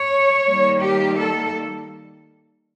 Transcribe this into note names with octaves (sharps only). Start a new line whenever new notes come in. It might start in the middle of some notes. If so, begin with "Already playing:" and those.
Already playing: C#5
D#3 G3 A#3
G4
A4